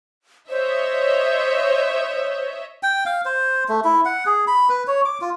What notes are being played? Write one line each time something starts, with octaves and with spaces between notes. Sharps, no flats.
C5 C#5 D#5 E5
G5
F5
C5
A3
E4
F#5
G#4
B5
B4
C#5
D6
F4